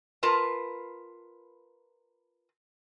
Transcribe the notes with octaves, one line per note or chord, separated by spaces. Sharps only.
F4 A#4 B4 A5